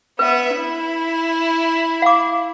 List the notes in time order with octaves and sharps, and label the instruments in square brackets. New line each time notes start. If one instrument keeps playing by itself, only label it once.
[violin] B3 E5 [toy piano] B4
[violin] E4
[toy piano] F5 D6